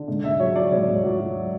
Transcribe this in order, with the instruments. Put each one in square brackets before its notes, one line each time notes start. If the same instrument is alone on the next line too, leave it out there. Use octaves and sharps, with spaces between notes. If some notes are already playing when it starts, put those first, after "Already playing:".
Already playing: [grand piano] D3
G#2
G#2 E5
F#3 C#5
F#3 D5
G#2 C#5
G#2
F#3
F#3